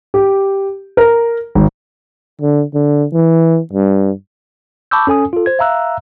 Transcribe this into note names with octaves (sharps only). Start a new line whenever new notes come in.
G4
A#4
G#1
D3
D3
E3
G2
A5 B5 C#6 D6 E6 G6
C#4 A4 G#5 D#6
F4 A4
C5 G#6
E5 F5 A#5 E6 F#6